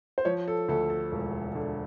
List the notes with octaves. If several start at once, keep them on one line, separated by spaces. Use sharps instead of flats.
C5
F3 C#5
A4
D2 A4
A4
E1
D3